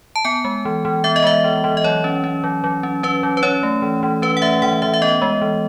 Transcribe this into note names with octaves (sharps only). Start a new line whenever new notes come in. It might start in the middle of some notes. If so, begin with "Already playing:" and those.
A5
B3 G#5
G#3
E3
E3
B3 E5
D#5
G#3 E5
E3
E3
D#5
F#3 C#5
C#4
C#4
F#3
F#3
C#4
C#4 B4
F#3
B4
C#4 C#5
A3
E3
E3
C#4 B4
F#5
A3 E5
E3 F#5
E3 E5
E5
B3 D#5
G#3
E3